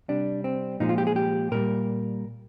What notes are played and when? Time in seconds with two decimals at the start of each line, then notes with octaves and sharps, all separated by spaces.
0.08 C3 G3 D4
0.44 C4
0.80 A#2 F3 G#3 D#4
0.89 F4
0.98 G4
1.07 G#4
1.16 G4
1.51 A#2 G3 A#4